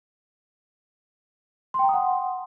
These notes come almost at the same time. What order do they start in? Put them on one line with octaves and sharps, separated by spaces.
C6 G5 A#5 D#6 F#5